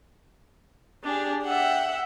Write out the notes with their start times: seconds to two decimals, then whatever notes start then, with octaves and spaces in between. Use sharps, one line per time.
1.03 D4 G4 G#4
1.44 E5 F#5 G5